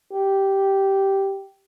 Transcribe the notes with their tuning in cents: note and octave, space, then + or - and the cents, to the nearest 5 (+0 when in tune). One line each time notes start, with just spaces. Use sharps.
G4 -10